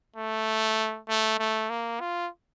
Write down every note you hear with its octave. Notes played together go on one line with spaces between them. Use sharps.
A3
A3
A3
A#3
F4